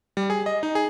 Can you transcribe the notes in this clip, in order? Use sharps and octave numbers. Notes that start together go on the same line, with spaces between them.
G3
G#4
D#5
D#4
G#4